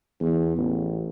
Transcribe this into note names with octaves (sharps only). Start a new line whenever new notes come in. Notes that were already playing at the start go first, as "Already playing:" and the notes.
E2
A1